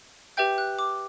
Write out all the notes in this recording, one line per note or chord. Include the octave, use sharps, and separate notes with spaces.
G4 B4 E5 G5 G6
F#6
D6